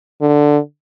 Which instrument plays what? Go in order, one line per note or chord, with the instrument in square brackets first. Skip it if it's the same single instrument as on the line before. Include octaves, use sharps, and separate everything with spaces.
[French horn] D3